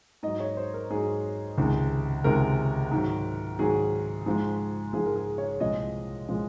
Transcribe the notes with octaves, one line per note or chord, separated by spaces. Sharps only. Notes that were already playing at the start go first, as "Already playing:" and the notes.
G#2 F#3 D#5
C#5
C5
A#4
G#2 F#3 G#4
C#2 C3 D#3 G#3
C#2 C3 D#3 G#3 A#4
G#2 D#3 F#3
G#2 D#3 F#3 G#4
G#2 F3 G#3
G#2 F3 G#3 G#4
A#4
G#4
C#5
C2 A#2 F3 G#3 D#5
A#2 F3 G#3